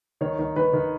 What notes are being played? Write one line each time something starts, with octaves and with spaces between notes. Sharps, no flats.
D#3 C#5
D#3
D#3 B4
D#3